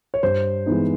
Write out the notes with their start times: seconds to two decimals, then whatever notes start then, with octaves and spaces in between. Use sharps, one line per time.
0.14 C#5
0.23 G2 C5
0.66 E3 G#3 B3 D#4